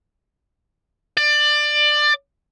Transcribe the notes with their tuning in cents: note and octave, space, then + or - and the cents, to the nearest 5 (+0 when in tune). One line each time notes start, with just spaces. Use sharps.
D5 +20